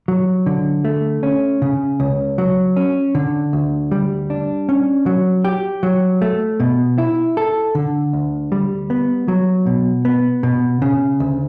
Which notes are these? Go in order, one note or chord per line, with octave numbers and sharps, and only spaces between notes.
F#3
D3
A3
C#4
C#3
C#2
F#3
C#4
D3
D2
G3
D4
C#4
F#3
G4
F#3
A3
B2
E4
A4
D3
D2
G3
B3
F#3
B2
B3
B2
C#3
D2